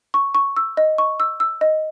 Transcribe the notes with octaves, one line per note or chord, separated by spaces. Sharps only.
C#6
C#6
E6
D#5
C#6
E6
E6
D#5